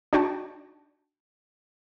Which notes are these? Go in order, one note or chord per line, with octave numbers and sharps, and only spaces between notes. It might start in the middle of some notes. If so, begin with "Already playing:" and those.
D4 D#4 F#4 G5 A5